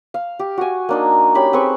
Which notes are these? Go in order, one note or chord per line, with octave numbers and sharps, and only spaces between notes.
F5
G4
F#4 G#5
A#3 D4 D#4
C#4 G4 B5
C4 G#4 B4 C#6